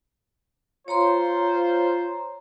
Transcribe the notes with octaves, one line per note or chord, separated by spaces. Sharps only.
F4 C5 C#5 A#5 C6